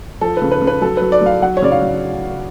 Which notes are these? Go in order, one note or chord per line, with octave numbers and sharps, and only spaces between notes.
F3 A4
C#3 B4
B4
C#3
B4
F#3 A4
F#3 B4
D5
F#3 F5
F#3 F#5
C#5
C#3 D5
F5
F#3